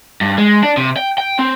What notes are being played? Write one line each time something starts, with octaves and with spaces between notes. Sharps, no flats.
G2
G#3
D4
C3
G5
G5
C4